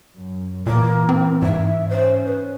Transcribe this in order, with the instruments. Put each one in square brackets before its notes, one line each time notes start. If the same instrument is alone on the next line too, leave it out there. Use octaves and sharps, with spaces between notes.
[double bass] F#2
[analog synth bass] A#2 [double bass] E3 [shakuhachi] A#3
[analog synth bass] C4
[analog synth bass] G#2 [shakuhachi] E5
[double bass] C#4 [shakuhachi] C5
[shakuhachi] B4